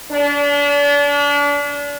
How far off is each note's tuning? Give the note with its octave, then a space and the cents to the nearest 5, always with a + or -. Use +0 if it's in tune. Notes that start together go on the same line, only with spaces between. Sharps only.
D4 -35